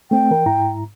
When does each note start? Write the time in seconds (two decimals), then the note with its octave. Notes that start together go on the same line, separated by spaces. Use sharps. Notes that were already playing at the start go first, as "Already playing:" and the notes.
0.11 A3 C4 G5
0.31 E3 A#4
0.46 G#2 E4 A#5